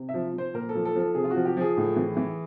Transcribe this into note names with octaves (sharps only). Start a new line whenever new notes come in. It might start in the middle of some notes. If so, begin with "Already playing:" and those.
Already playing: C3
E5
F3
F3 C5
A#2 A#4
A4
F3
A4
F3 A4
C3 G#4
F4
F3 F#4
G4
F3 G#4
A2
E3
E3